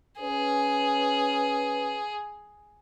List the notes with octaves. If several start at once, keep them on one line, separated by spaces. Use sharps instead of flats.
C#4 G#4 B4